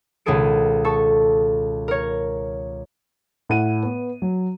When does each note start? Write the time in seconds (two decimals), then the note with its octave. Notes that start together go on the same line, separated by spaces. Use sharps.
0.26 C#2 B2 D#3 G#4 A4 D7
0.84 A4 A5 C#6
1.88 A#4 C#5
3.49 A2 F#5 D#7
3.83 B3 B4
4.22 F#3